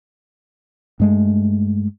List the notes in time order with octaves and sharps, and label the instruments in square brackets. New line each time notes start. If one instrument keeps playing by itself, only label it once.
[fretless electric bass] G2 G#3 A3